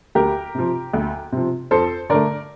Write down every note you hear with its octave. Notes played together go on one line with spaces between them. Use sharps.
D2 G4 A#4
C3 F3
D2
C3 F3
F2 A4 C5
D3 A3 A#4 D5